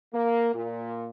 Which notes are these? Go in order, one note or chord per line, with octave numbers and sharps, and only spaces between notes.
A#3
A#2